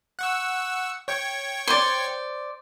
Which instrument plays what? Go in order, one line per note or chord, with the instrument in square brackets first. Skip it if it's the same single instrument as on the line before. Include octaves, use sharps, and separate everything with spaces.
[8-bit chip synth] F#5 C#6 E6
C#5 G5 C#6
[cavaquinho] C5 D5